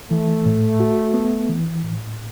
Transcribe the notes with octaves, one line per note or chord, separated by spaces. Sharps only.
E3 A3
A2
F#4
B3
E3
A2